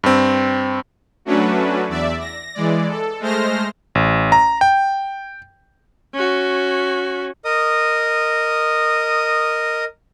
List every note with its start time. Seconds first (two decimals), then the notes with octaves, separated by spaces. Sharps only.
0.04 G2 C4
1.25 F#3 A3 C#4 D4 F#4 B4
1.88 E2 D5 E5
2.20 A#6
2.55 E3 G#3 D5
2.89 A4
3.20 G#3 A3 C5 F6 A#6
3.95 A1
4.32 A#5
4.61 G5
6.14 C#4 F#4
7.45 A#4 D#5 D#6